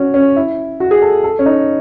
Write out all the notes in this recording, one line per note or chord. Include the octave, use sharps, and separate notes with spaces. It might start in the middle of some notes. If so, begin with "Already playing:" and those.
Already playing: C#4 F#4
C#4
E4
F#4
G#4
A4
A4
C#4
D#4